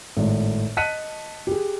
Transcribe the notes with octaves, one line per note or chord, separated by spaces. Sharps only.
G#1 A2
D#5 A5 F#6 B6 C#7 D#7
G4 G#4